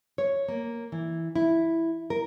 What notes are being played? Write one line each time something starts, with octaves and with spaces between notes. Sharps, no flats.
C#5
A#3
E3
E4
A#4